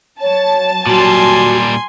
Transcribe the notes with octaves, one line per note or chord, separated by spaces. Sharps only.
F#3 C#5 A5
A#2 G3 F#4 G#5 C6